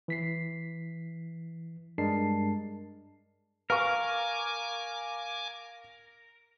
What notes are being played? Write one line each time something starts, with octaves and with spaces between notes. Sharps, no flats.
E3 B6 C7
G2 G#3 D4 A#4 A5 C7
A#4 B4 F5 G#5 C#6 D6